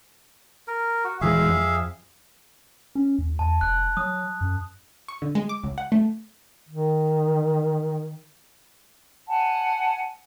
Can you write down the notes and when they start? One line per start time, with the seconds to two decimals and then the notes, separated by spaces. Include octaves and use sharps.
0.68 A#4
1.04 F#4
1.21 D#1 E3 G#3 G#4 E5 F5
1.49 F2
2.95 C#4
3.19 D#2
3.39 E2 A5
3.61 F1 F#6
3.97 F#3 D#6
4.41 F#2
5.08 C#6
5.22 D3
5.35 G#3
5.49 D6
5.64 C#2
5.78 F#5
5.92 A3
6.69 D#3
9.28 F#5 G#5 A5